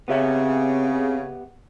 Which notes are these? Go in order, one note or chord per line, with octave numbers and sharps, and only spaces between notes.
C#3 B3 C4 G4 E5